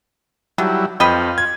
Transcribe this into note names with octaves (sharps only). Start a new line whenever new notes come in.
D3 D#3 F#3 G3 E4
F2 F4 B4 D#5 G5
G#6